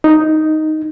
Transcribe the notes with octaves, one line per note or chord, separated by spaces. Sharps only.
D#4